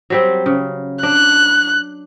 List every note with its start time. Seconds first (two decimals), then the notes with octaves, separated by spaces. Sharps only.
0.10 F#3 G3 C4
0.46 C#3
1.03 D4 F#6